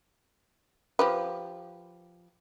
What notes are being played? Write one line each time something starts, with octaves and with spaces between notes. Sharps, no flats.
F3 G4 B4